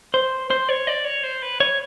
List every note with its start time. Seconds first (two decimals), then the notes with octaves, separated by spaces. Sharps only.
0.14 C5
0.50 C5
0.69 C#5
0.87 D5
1.05 C#5
1.23 C5
1.42 B4
1.60 C#5